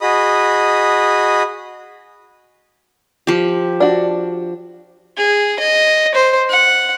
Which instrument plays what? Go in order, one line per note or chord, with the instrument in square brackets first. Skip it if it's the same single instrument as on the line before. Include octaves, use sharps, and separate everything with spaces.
[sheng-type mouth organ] F#4 G#4 D#5 B5 D#6
[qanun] F3 G4
[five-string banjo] D4 F#4
[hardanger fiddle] G#4
D#5
C5
F#5